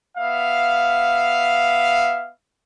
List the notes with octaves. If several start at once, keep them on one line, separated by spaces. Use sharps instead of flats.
B3 E5 F5